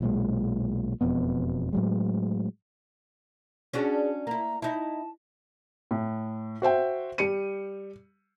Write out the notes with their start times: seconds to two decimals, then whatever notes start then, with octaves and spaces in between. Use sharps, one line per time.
0.01 B1 A#2 E3 G#3
1.01 E1 F2 B2 B3
1.73 A2 F#3 G#3
3.73 C#4 D4 F#4 G#4
4.27 A#3 E4 A#5
4.62 D#4 E4 A5
5.91 A2
6.62 F#4 C5 E5 G5
7.18 G3 C#7 D#7